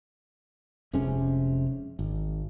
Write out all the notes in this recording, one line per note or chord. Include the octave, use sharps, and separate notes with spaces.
F1 C3 G#3 C#4
G#1